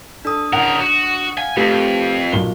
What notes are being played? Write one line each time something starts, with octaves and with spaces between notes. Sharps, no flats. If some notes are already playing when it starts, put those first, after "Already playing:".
D4 A4 D#6
C#3 A#4 F#5
F#4
F5 G#5
F2 A3 G4 B4
B1 A#2 G7